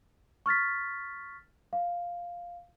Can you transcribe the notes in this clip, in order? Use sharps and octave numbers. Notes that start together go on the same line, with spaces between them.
C#6 F6 A6 B6
F5